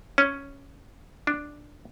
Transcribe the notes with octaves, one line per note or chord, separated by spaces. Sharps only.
C#4
D4